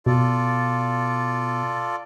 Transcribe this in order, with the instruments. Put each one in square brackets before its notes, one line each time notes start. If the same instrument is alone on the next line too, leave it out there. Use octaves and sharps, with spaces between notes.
[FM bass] B2 [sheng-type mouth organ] F4 A4 D5